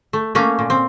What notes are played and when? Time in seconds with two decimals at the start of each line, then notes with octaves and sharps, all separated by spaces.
0.13 A3
0.35 A3 A#3 C#4
0.59 A#2
0.70 C4